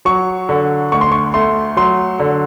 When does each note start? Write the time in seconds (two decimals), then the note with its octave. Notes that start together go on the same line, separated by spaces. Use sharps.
0.05 F#3 C#6
0.49 D3
0.92 D2 C#6
1.01 C6
1.12 C#6
1.34 A3 C6
1.77 F#3 C6
2.20 D3